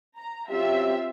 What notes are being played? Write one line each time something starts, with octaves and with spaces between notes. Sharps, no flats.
A#5
F#3 C4 C#4 F4 G4 E5